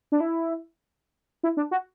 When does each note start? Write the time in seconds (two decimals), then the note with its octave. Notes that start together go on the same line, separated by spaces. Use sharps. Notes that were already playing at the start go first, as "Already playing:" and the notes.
0.12 D4
0.20 E4
1.43 E4
1.57 D4
1.71 F#4